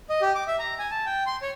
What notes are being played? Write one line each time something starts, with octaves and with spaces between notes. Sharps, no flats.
D#5
G4
D6
E5
A#5
G#5
A5
G5
C6
C#5